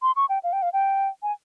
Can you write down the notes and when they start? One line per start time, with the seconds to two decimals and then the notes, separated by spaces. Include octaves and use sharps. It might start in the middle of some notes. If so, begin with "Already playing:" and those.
0.02 C6
0.16 C#6
0.29 G5
0.43 F5
0.53 G5
0.62 F5
0.73 G5
1.23 G#5